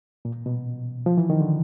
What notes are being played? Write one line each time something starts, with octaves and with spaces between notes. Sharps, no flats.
A#2
B2
F3
E3
D#3
D3